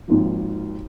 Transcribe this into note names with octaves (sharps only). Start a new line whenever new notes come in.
G#1 D#2 F3